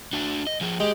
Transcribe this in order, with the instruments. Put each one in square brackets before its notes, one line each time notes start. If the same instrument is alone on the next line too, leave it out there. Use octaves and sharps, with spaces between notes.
[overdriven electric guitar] D4 F#4
D#5
F3 G#4
[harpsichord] G#3 [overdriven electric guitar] G4